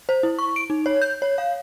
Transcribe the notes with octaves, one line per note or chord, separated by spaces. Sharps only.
C5
E4
C#6
D7
D#4
C#5
G6
C#5
F5